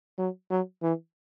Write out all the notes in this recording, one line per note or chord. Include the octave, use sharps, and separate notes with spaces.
F#3
F#3
E3